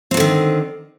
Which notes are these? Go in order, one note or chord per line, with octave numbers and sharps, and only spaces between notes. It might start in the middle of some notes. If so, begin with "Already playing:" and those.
D3 D#3 F#3 C4